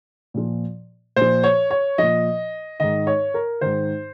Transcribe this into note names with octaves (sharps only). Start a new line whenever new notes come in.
A#2 F3
A#2 F3 C5
C#5
C#5
A#2 F3 D#5
G#2 D#3 D#5
C#5
A#4
G#2 D#3 C5